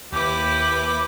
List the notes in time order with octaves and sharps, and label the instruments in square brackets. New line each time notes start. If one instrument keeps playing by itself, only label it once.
[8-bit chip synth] D#2 D6 [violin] E4 B4 [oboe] G4